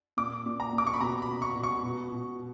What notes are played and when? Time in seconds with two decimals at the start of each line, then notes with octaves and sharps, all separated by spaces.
0.17 A#2 D6
0.46 A#2
0.60 A#5
0.73 A#2
0.78 D6
0.87 C#6
0.94 B5
1.01 B2 A#5
1.22 B5
1.28 B2
1.42 C#6
1.56 B2
1.63 C#6
1.83 B2
2.12 B2